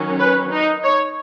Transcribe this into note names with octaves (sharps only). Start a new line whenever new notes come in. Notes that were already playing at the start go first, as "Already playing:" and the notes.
Already playing: D#3 F#3 C#4
B4
D#4
C#5